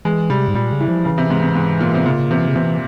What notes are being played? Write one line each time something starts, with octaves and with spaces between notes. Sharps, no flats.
E3 G#3
C3 G3
G#2
A#2 G3
C#3
E3
F3
C#3 E3
C3
G#2
G#2
G#2
A#2
C3
A#2 C#3
C3 E3
C#3
C3 E3